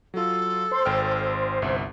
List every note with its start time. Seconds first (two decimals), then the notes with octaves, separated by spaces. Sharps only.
0.14 F#3 F4 A4
0.71 C5
0.85 G#1 G5 F6
1.62 G1 C2 E5